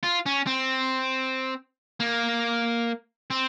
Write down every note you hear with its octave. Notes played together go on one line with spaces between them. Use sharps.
F4
C#4
C4
A#3
C4